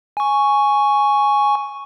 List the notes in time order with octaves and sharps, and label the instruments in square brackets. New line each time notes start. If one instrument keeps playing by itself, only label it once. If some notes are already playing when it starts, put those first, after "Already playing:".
[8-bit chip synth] G#5 C#6